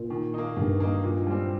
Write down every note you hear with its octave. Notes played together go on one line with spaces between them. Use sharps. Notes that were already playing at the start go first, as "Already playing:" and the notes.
Already playing: A#2
D#3
A#3 D#4
G2 D#3
A#3 D#4
A#2
G3 C4